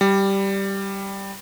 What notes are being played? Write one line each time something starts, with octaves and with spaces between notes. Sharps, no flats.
G3